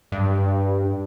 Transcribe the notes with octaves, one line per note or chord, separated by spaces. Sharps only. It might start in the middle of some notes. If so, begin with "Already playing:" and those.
G2